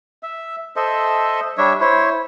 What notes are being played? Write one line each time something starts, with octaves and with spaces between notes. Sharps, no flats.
E5
A4 C5 D#5 E5
G3 D4 C#5 E5
E4 C5 C#5